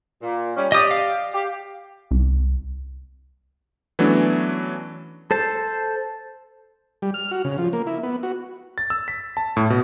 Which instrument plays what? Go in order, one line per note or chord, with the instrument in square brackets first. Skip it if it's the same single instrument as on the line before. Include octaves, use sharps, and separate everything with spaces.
[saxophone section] A#2
G3 C#4
[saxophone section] G4 D5 [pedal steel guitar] D#5 D#6
[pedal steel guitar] F5
[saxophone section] G4
[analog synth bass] C2
[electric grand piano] E3 F#3 A3 B3 C#4 D4
[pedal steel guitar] A4 C5 A5
[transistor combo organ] G3
F6
F#4
C#3
F3
A#3
E4
B3
F#4
[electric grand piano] A6
E6
B6
A5
A2
B2